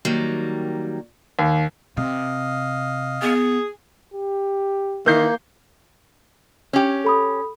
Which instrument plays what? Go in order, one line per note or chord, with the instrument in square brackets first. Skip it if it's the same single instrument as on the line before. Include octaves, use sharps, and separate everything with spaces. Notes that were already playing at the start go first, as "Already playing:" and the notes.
[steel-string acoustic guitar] D#3 F#3 G3 A#3
[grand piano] D#2
[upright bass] C3 [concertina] D#5 F5
[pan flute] B3 [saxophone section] G#4
[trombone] G4
[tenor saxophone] D#3 [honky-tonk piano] E3 G6 C7 [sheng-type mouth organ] A#3
[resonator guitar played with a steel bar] C#4 G4
[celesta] A4 B5 D#6